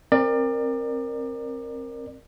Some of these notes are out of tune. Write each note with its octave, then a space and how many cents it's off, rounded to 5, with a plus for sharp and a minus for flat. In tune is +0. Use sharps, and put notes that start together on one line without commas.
C4 +25 A#4 +0 D5 +30